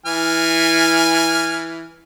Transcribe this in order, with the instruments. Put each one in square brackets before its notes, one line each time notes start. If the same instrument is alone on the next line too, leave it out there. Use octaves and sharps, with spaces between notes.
[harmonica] E3 G#5 F6